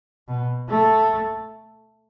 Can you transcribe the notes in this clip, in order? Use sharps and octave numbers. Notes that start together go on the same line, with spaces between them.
B2
A3